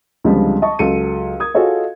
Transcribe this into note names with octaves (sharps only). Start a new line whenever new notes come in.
C#2 D3 F3 G3 G#3 C4
D#5 A5 C#6
C#2 F#3 A4 C#7 D#7
A#4 D#6 G#6
F4 F#4 G#4 A4 C#5 D#5